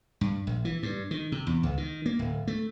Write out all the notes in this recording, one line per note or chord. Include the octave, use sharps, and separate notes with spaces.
G2
A#1
E3
G2
D#3
C3
E2
C#2
D#3
A#3
D1
A3